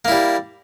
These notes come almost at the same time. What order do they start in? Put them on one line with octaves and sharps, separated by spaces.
A#3 E4 G3